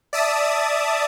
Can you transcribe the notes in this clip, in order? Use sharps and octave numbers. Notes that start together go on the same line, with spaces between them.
D5 E5 A5 D#6